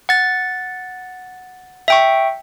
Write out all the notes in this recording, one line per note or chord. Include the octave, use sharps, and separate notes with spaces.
F#5 A6
E5 G5 C#6